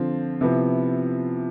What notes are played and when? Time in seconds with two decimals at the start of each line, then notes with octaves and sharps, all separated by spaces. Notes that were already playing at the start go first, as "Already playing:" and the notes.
Already playing: D3 F3 C4 F4
0.41 C3 F3 B3 E4